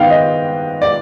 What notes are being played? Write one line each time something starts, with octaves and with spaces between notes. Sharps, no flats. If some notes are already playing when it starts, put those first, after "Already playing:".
Already playing: G#2 D#3 B3 F5 G5
D#5
D5